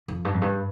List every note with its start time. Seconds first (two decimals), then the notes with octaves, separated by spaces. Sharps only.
0.08 F2
0.25 G2
0.34 F2
0.42 G2